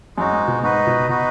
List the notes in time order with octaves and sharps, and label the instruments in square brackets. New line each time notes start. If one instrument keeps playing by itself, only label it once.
[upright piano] F#2 [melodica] G#3 D#4 F#4
[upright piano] G#2
B2
[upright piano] G#2 [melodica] D#4 F#4 B4 D#5
[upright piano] B2
[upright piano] B2 [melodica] D#4 F#4 B4 D#5